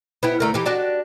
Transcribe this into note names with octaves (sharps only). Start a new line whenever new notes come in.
B3 E4 G4
D2 A3 A#4
E3 G4
D4 F#4 G4